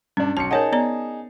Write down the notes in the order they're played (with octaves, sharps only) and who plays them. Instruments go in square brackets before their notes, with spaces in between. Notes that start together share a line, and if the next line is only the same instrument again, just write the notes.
[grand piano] G2 D4 [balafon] C#4
[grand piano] B1 C#7 [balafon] A5
[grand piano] D#4 G#4 A5 [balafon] A#4 C#5 F#5
[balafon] B3 D5 A#5